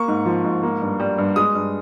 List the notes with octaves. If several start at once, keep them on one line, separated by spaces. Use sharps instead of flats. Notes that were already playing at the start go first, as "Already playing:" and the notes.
Already playing: A#3 C#6
G#2
F3
G#2
A#3
G2
G3
G2
G#3 D#6
G2